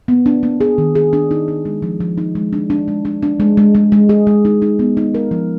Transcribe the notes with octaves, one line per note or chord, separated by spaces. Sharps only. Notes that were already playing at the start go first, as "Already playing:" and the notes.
B3
D4
A#3
G#4
D#3
G#4
D4
D#4
D#4
G#3
F3
F3
D#4
G#3
D4
D4
G#3
D4
D4
G#3
G#3
G#3
G#3
G#4
G#3
D#4
D#4
B3
D#4
A#4
F3